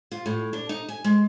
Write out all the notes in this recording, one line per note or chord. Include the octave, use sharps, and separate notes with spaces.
F4
A2
D4
D#4
G#5
G#3